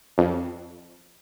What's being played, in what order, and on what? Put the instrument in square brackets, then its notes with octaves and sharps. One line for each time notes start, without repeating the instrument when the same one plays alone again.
[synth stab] F2